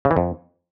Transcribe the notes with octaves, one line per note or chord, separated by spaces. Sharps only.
C#3
E3
F2